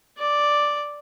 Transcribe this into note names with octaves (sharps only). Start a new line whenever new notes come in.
D5